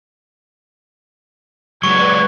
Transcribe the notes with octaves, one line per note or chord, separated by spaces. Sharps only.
F#3 G#3 F#4 B4 D5 C#6 F#6 G#6